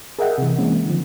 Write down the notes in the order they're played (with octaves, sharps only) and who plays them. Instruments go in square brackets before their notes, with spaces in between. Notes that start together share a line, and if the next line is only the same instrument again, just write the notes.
[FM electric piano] G#4 A#4 D#5 E5 F#5 G5
C3 E3
E3 G#3 A#3 C4 C#4
D3 D#3 F3